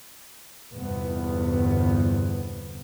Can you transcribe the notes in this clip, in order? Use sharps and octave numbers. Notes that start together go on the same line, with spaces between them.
G1 E2 G2 C3 B3